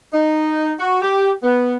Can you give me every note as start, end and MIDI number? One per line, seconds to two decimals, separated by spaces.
0.13 0.72 63
0.79 1.02 66
1.02 1.31 67
1.44 1.77 59